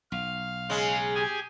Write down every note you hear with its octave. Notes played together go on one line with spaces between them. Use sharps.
B1 F5
C#3 G#3
G4 G#4 G#5